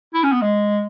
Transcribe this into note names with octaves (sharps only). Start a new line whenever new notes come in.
E4
C#4
B3
G#3